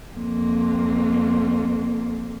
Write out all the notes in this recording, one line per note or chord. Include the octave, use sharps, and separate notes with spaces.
F2 A#3